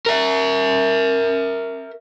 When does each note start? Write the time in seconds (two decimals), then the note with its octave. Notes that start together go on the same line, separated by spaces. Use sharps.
0.06 A#4 E5